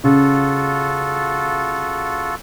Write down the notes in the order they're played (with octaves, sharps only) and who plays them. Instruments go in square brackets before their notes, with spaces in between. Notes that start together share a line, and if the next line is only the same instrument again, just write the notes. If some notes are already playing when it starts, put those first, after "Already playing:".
[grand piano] C#3 [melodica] F4 F#4 A4